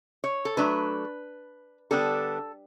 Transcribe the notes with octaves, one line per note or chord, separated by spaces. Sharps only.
C#5
A4
F#3 A3 D4 B4
D3 G3 B3 D4 A4